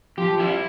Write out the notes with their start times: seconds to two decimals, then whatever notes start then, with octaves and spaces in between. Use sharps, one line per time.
0.18 F3 G4
0.40 E4